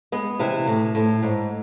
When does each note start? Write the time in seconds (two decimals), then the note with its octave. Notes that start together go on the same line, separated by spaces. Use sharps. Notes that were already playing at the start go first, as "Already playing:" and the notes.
0.12 G#3 B3
0.39 C3 E3
0.67 A2
0.95 A2
1.22 G#2